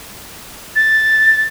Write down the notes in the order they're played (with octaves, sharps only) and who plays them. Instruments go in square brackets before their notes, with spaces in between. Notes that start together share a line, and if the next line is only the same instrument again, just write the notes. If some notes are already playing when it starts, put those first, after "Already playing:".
[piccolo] A6